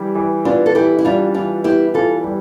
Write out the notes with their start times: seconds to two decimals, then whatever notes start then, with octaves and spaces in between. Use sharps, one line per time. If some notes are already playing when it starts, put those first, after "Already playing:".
Already playing: E3 G3
0.15 E3
0.45 B3 D4 F4
0.66 A4
0.75 E3 E4 G4
0.99 E4
1.05 G3 D4 F4
1.34 E3 D4 F4
1.64 B3 E4 G4
1.94 E3 F4 A4
2.24 G3